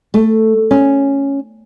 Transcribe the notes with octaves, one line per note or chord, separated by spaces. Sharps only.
A3
C#4